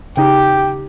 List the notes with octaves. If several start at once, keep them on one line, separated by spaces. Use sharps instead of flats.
C#3 D#4 G4 G5